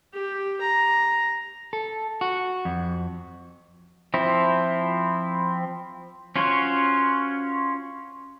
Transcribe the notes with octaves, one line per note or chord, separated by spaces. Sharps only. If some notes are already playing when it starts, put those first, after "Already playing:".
G4
A#5
A4
F#4
F2
F3 C4 E4
C#4 F4 F#4 C5 C#5